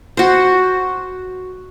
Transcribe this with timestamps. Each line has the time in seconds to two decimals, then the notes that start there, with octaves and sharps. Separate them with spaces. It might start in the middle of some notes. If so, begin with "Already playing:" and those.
0.17 F#4 C5